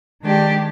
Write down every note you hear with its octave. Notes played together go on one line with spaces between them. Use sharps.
D#3 G#3 D4 G4 D5